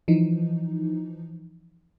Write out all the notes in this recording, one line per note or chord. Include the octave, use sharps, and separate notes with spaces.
E3 F3 D#4